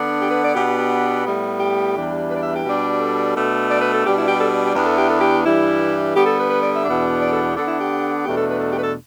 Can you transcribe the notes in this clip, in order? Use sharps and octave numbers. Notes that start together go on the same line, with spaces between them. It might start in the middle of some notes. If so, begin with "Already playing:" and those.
Already playing: D3 B3 D4
G4
B4
D5
B2 B3 D4 G4
G4
G4
A2 G3 B3
G4
E2 E3 G3 D4
B4
D5
E5
G4
B2 G3 D4
A4
B2 A3 D4
D5
B4
A4
B2 G3 D4 G4
E4
G4
A4
G4
E2 E3 B3 D4 G4
A4
G4
A4
G4
G2 E3 G3 E4
D3 G3 B3 G4
A4
B4
B4
D5
E5
E2 B2 B3 D4
D5
A4
D3 B3 D4 A4
E4
G4
E2 B2 A3 D4 G4
A4
B4
A4
G4
B4
A4